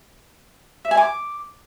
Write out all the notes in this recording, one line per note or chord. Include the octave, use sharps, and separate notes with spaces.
E5
G#5
D6